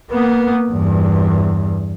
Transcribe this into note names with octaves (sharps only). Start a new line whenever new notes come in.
A#3 B3
E2 G2